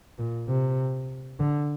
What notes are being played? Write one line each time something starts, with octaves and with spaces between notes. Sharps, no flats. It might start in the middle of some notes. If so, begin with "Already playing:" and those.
A#2
C3
D3